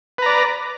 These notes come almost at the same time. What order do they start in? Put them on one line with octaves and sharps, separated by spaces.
B4 A#5 D5